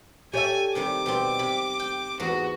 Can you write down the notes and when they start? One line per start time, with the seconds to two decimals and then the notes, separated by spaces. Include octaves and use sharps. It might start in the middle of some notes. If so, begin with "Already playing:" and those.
0.33 G4 A4 C#5 D5 E5 G#5
0.75 C3 D#3 G3 D6
1.06 B2 G3 C4
1.39 C3 B5
1.80 G5
2.19 E2 G#2 B3 F#4